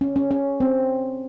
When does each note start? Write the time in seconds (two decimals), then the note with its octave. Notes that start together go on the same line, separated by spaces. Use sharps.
0.01 C#4
0.16 C#4
0.31 C#4
0.60 C4